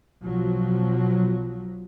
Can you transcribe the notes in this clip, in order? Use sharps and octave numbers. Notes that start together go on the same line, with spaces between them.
B1 F3 F#3